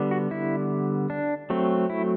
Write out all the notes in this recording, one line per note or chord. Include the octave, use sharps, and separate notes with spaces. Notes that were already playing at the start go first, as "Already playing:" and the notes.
Already playing: D3 G3 B3
F#4
E4
D4
F#3 A3 C4
E4